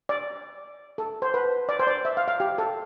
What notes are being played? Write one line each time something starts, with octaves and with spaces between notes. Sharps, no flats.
D5
A4
C5
B4
D5
C5
D5
E5
F5
F5
G4
A4